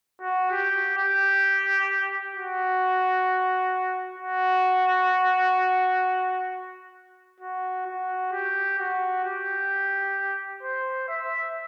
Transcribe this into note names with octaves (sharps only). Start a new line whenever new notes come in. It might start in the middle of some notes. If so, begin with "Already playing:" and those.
F#4
G4
G4
F#4
F#4
F#4
F#4
G4
F#4
G4
C5
E5